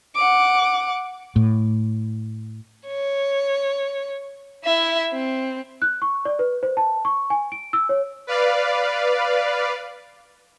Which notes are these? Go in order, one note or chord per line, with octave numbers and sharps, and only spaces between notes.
F#5 D6
A2
C#5
E4 E5
C4
F#6
C#6
D5
B4
C5
A5
C#6
G#5
D7
E6
C#5
B4 D5 F5